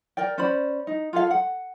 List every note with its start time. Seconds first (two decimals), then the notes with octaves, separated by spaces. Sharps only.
0.17 A#4 D5 G5
0.38 C#4 C5 D5 B5
0.87 D#4
1.13 F4 G#4 A4 F5
1.31 F#5